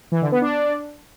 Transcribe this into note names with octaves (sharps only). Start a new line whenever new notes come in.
E3
D3
B3
D4